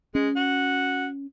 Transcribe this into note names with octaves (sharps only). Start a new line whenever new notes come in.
G#3 C#4
F#4